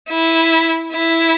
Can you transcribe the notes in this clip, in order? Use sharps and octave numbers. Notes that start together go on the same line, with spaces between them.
E4
E4